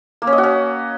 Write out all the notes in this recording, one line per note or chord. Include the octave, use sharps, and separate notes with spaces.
A#3
C#4
D#5
F#4
C#4